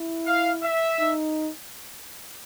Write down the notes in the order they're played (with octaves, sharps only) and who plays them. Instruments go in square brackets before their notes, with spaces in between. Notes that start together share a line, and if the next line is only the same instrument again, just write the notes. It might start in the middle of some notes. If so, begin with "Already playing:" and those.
Already playing: [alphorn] E4
[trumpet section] F5
E5
[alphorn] D#4